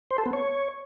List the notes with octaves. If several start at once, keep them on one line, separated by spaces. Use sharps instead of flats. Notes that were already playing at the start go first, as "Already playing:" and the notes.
C5
A4
B3
C#5